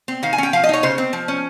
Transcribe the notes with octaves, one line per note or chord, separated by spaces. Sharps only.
C4
D#3 F5
G#5
C#4 G5
F3 F5
D#5
D#4 C#5
C#3 C5
C4
F3
C#4